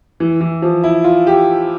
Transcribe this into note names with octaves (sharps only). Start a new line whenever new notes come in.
E3
E3
F3
E4
F4
G4